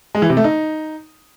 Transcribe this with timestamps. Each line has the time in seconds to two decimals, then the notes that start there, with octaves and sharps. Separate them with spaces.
0.15 G#3
0.22 E3
0.29 C3
0.37 A3
0.44 D#4